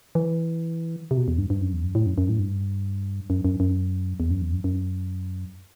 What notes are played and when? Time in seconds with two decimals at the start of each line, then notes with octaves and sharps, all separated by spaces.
0.15 E3
1.11 C3
1.17 B2
1.28 E2
1.38 G2
1.50 G2
1.61 F#2
1.73 E2
1.84 F#2
1.95 A2
2.06 F#2
2.18 F#2
2.29 A2
2.40 G2
3.30 F#2
3.45 F#2
3.60 F#2
4.20 E2
4.31 F#2
4.41 E2
4.53 F#2
4.64 F#2